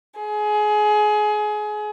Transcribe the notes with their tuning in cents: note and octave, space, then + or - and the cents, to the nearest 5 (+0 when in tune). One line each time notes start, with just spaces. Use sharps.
G#4 +25